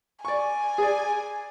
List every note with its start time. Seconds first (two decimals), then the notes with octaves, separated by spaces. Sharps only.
0.25 D5 G#5 C#6
0.78 G#4 D5